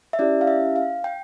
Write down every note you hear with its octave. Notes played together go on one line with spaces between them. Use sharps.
E5
C#4 E4 G4 D5
F5
E5
F5
G5